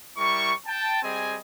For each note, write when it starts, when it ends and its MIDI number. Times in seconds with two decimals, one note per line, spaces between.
0.18 0.53 55
0.18 0.53 64
0.18 0.53 70
0.18 0.53 85
0.66 1.00 79
0.66 1.00 81
1.03 1.38 55
1.03 1.38 60
1.03 1.38 68
1.03 1.38 75
1.03 1.38 80